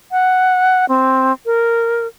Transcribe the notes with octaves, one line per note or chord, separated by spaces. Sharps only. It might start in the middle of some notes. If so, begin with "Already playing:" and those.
F#5
C4
A#4